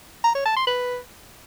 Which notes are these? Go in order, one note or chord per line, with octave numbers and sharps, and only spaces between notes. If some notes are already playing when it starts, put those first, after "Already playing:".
A#5
C#5
A5
C6
B4